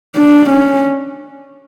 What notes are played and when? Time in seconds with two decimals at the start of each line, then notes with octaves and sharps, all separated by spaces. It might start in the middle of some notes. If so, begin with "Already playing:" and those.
0.16 D4
0.50 C#4